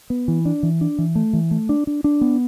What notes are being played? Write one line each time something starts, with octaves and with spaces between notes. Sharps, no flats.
B3
E3
D4
E3
D4
E3
A3
E3
A3
D4
D4
D4
B3